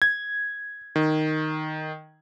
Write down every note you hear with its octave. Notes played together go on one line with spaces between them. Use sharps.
G#6
D#3